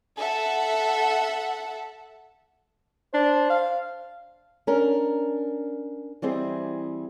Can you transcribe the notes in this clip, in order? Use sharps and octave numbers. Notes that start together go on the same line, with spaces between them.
A4 E5 F#5
D4 C5
F5
C#4 D4 A#4
E3 G3 C4 G#4 D#5